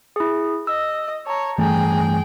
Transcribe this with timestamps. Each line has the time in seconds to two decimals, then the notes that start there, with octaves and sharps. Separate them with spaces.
0.16 E4 G#4
0.67 D#5 E6
1.27 C#5 A5 A#5
1.59 G2 E3 A3 G#4 G5